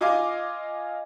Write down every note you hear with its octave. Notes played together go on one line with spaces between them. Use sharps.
F4 D#5 F5 G#5 D6